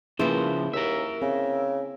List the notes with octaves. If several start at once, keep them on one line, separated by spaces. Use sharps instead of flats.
C#3 F3 A#3 E4 G#4 B4 C5
D#2 A#4 E5
C#3 C4